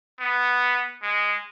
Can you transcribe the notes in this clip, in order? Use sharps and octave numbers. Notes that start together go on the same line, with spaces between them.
B3
G#3